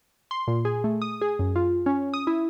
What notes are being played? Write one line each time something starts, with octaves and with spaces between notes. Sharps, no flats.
C6
A#2
G#4
A3
D#6
G#4
F#2
F4
C#4
D#6
E4